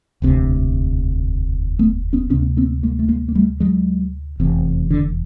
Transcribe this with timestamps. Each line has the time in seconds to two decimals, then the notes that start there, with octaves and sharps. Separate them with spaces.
0.22 E1 D2 C3
1.79 A3 B3
2.13 B3 C#4
2.30 D2 C3 B3 C#4
2.57 A#3 C4
2.83 G#3 A#3
2.99 A3
3.08 G#3 A#3
3.28 A#3
3.35 G3 A3
3.60 F#3 G#3
4.40 F1 E2 C3
4.91 D3